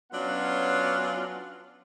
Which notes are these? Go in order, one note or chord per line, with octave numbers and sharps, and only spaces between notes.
F#3 B3 C#4 D4 F4 F#5